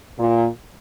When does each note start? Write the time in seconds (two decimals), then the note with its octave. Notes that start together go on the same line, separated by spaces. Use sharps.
0.18 A#2